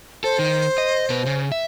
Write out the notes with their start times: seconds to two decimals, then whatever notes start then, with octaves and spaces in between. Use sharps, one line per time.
0.24 A4 C5
0.39 D#3
0.78 D#5
1.10 B2 B4
1.26 C#3
1.52 E5